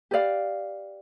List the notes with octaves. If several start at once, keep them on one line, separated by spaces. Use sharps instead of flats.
G4 B4 D5 F5